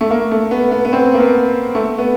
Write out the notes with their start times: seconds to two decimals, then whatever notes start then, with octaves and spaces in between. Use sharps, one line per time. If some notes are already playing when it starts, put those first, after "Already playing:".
0.01 A3
0.11 A#3
0.31 A3
0.51 B3
0.72 B3
0.85 B3
0.93 C4
1.14 A#3
1.20 B3
1.75 A3
1.98 B3